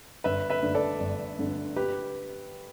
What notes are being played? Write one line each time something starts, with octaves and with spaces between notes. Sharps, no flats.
G1 B4 E5
B4 E5
G2 D3 A3 D4
A4 D5
G1
G2 D3 A3 D4
G4 B4